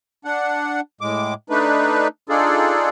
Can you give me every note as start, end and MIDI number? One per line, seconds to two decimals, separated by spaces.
0.25 0.81 62
0.25 0.81 78
1.01 1.34 45
1.01 1.34 56
1.01 1.34 86
1.50 2.08 57
1.50 2.08 62
1.50 2.08 63
1.50 2.08 71
2.29 2.89 62
2.29 2.89 63
2.29 2.89 65
2.29 2.89 68
2.29 2.89 69
2.29 2.89 74